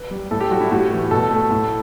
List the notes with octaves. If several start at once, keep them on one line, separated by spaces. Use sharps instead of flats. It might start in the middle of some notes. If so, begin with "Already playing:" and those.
Already playing: B4
G3
A2 A4
G4
G3 F#4
E4
A2 F#4
E3 A3
B2 A4
A3
A2